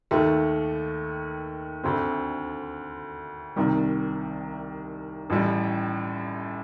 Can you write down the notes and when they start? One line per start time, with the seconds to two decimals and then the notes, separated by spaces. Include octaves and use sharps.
0.11 D#2 D#3 A3
1.84 D2 D3 A3 C4
3.56 C2 C3 D#3 G3
5.30 A1 A2 G3